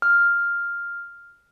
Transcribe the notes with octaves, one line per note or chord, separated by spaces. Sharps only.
F6